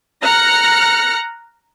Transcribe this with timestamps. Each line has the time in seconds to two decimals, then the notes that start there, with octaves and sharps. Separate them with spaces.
0.22 A#5 F6 F#6 A#6 C#7